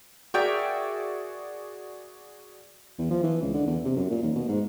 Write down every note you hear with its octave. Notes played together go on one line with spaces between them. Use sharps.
F#4 G#4 A#4 D5 E5 G5
E2
F3
E3
C#2
D3
E2
C3
F#2
A#2
D#2
B2
G#2